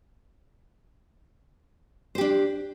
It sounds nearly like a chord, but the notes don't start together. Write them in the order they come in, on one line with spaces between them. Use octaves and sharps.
C5 G4 D4